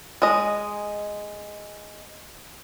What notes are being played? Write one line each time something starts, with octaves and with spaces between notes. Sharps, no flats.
G#3 D#5